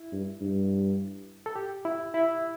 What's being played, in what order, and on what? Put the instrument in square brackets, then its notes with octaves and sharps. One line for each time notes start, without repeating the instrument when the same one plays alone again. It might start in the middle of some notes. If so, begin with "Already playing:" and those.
Already playing: [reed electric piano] E4
[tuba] G2
G2
[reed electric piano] A4
G4
E4
E4